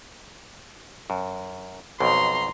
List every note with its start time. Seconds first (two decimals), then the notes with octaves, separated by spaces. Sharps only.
1.10 F#2
2.00 B1 F2 B2 A#5 C6